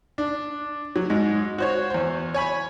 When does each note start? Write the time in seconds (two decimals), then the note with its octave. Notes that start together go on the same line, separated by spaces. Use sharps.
0.18 D4
0.96 F#3
1.10 G#2 G#3
1.58 F#4 C5 C#5
1.90 E2 C5
2.34 C#5 G#5 B5